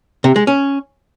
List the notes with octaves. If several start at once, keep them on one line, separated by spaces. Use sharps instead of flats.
C3
G#3
C#4